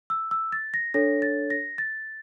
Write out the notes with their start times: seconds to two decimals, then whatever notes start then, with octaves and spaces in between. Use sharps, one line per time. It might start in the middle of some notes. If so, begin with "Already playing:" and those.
0.10 E6
0.31 E6
0.52 A6
0.74 A#6
0.94 D4 A4 C#5 A#6
1.22 A6
1.50 A#6
1.78 A6